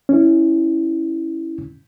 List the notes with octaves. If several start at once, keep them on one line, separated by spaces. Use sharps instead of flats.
C#4 E4